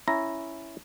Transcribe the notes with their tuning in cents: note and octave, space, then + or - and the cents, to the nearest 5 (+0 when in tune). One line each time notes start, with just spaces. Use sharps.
C#4 +0 E4 +0 A#5 +0